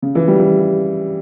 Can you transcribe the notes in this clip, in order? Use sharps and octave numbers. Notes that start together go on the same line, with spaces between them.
C#3
E3
G3
E3